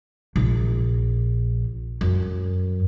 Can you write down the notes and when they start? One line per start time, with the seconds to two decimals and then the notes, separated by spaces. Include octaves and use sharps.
0.36 A#1
2.01 F#2